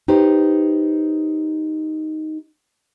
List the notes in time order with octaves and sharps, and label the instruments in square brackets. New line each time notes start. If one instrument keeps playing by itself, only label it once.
[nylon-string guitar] D#4 G4 B4 C5